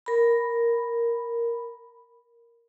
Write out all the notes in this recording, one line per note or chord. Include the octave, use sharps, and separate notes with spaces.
A#4 B5